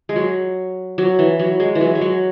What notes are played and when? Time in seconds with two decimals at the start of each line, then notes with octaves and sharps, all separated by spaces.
0.09 G#3
0.16 F#3
0.98 F#3
1.19 E3
1.39 F#3
1.60 G#3
1.75 E3
1.81 F#3
1.95 G#3
2.01 F#3